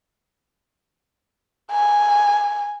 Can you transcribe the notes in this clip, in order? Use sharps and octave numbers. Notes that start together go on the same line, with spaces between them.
G#5